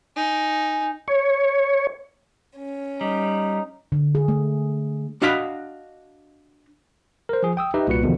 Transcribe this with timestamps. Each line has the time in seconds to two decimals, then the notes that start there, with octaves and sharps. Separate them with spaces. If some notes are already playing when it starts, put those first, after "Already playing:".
0.16 D#4 G#5
1.08 C#5
2.58 C#4
3.01 G3 D#4
3.92 D3
4.15 G#4
4.28 A3
5.22 D4 F#4 D#5 F5 B5
7.29 A#4 C5
7.43 F3 G#4
7.57 G5 D#6 E6
7.74 D#4 G4 B4 D#5 E5
7.87 C2 A#2 F#4 B4 C#7
8.03 E2 B2 D3 D#3 F3